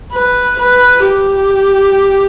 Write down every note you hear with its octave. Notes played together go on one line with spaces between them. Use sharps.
B4
B4
G4